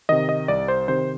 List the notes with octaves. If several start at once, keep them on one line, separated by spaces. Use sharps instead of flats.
C3 D#3 D#5
D#5
C2 D5
C5
C3 D#3 C5